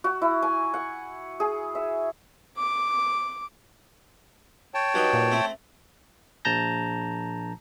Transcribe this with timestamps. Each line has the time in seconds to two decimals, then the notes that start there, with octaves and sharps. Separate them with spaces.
0.04 F#4
0.22 E4
0.43 G#5
0.74 F#5
1.40 G#4
1.75 E5
2.57 D6
4.74 C#5 G5 A5
4.94 G2 F#3 D#4
5.13 A#2
5.32 A3 C4
6.45 A#1 A5 A#5 G6 A#6